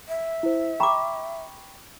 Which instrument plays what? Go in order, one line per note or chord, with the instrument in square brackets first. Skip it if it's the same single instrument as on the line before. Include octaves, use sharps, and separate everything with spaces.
[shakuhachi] E5
[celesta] E4 C5
[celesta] G5 B5 C#6 [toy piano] A#5 D6